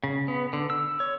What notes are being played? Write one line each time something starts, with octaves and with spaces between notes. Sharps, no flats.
C#3
B3
D3
E6
C#5